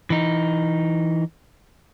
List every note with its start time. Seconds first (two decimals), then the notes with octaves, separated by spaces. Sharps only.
0.10 E3 D#4